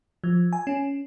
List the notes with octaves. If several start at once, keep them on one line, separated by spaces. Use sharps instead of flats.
F3
G#5
C#4